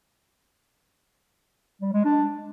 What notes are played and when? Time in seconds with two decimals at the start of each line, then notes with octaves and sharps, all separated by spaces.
1.81 G3
1.93 G#3
2.05 D4